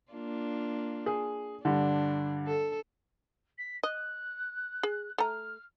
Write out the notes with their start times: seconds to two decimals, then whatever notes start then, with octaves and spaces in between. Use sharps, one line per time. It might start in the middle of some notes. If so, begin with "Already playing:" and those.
0.12 A#3 D4 F4
1.06 G#4
1.65 G2 D3 D4
2.47 A4
3.58 B6
3.83 D#5 F#6
4.83 G#4
5.18 A3 A#5 F6